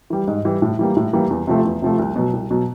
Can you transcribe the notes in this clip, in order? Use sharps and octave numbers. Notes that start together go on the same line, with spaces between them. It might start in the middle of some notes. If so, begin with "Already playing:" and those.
E3 G3
G#2
E3 G3
A2
E3 G3 A#3
A2
E3 G3 A#3
E2
C3 F3 A3
E2
C3 F3 A3
C2
B2 F#3
C2
B2 F#3